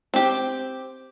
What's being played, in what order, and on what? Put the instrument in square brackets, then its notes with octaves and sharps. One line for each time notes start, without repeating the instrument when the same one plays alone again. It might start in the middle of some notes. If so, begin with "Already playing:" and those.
[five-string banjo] C4 G4